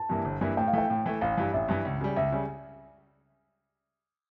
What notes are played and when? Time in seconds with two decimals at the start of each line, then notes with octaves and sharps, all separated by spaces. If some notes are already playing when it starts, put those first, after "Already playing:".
Already playing: A5
0.09 G2 E3 A#3 E4
0.25 G1
0.41 G2 E3 A#3 E4
0.57 A2 G5
0.68 F5
0.73 E3 A3 G5
0.90 A2
1.06 E3 A3
1.21 A1 F5
1.37 G2 E3
1.53 A1 E5
1.68 G2 E3
1.85 C#2
2.01 C#3 G3
2.16 C#2 E5
2.32 C#3 G3